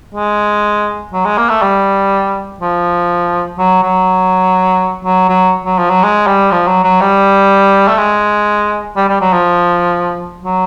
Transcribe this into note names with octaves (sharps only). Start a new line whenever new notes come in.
G#3
F#3
G#3
A#3
A3
G3
F3
F#3
F#3
F#3
F#3
F#3
F3
F#3
G#3
G3
F3
F#3
F#3
G3
A3
G#3
G3
G3
F#3
F3
F#3